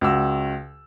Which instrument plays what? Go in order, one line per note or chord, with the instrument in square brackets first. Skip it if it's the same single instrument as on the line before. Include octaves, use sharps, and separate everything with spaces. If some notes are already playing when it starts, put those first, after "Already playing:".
[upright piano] C#2 F#4 E6